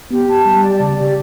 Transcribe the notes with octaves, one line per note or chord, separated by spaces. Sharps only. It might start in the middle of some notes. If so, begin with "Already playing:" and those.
B3 G4
A5
G3 G4
D5
C#3 D5
C#3 G4